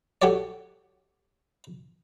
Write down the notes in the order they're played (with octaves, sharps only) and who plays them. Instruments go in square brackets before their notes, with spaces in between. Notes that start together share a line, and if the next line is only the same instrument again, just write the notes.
[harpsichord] F#4 G4 A4 C#5 D5